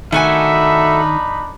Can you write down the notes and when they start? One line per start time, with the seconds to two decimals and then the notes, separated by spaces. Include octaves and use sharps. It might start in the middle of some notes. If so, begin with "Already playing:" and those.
0.12 D#3 A3 D4 D#4 F#4 E5 G#5 B5